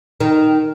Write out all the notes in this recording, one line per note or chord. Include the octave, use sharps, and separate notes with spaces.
D#3